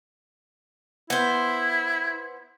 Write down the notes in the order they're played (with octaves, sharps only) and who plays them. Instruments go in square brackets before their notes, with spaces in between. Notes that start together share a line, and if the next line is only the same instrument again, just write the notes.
[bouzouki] B3 C5 [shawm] E4